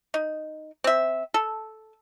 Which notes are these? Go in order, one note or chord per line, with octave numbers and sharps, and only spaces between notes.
D#4
C4 E5
A4